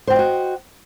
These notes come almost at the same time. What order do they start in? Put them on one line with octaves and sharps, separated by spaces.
C5 G5 F4 D#5 F#4